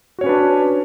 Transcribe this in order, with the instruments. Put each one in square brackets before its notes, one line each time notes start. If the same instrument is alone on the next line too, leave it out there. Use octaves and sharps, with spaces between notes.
[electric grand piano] F#4
C#5
C#4
B4
D4